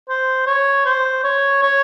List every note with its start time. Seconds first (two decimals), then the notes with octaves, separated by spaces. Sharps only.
0.09 C5
0.46 C#5
0.85 C5
1.24 C#5
1.62 C#5